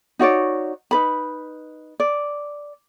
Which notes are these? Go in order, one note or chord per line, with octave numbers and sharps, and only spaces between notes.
D#4 F#4 C#5 D5
D#4 B4 B5
D5